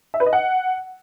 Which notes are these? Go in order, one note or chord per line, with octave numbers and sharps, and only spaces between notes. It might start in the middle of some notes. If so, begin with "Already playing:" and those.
E5
B4
D#5
F#5